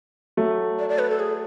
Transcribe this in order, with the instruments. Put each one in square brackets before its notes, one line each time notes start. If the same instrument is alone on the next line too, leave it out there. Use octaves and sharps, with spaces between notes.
[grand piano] F#3 A3
[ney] D5
D5
B4
A4
G#4